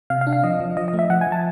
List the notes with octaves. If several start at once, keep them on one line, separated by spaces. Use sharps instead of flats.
C3 F5
F5
D4
F5
F3 D#5
F3
F3 D#5
D#5
A3
E5
F3 F#5
G#5
F3
A5